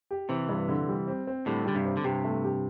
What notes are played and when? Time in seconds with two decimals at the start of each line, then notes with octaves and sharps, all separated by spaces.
0.11 G4
0.29 C3 E3 C4
0.49 G2
0.68 D3
0.88 G3
1.08 C4
1.27 C4
1.46 A2 D3 G3
1.66 D3 G3
1.75 G2 C3
1.86 C4
1.97 D3
2.04 G2 C3 G4
2.24 A3
2.44 G4